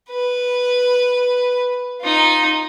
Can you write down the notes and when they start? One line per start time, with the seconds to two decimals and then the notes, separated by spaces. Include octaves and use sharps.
0.10 B4
2.01 D#4 F4